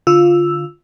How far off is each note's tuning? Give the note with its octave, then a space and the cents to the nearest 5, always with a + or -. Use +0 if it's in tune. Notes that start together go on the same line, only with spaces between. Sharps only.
D3 +0 F4 +0 E6 +0